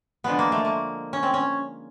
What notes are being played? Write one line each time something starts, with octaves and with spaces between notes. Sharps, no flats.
D3 F3 G#3 B3
A#3
A3
A#3
C#4
C4
C#4